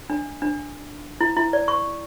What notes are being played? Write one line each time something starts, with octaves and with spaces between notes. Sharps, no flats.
D4
D4
E4
E4
D5
C#6